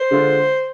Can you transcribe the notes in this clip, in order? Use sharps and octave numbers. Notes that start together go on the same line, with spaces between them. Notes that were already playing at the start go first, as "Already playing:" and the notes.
Already playing: C5
D3 G#3 D4 F4